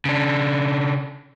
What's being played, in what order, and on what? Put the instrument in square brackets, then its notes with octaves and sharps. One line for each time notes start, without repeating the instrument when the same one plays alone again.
[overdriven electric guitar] C#3 D4